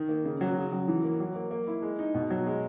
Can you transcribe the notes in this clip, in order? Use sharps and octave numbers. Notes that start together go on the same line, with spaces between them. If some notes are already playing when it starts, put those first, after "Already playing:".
Already playing: D#3
A#3
C#3
F#3
C#3
F#3
E3
A#3
F#3
A#3
A#3
E4
G#3
D#4
B2
F#3
G#3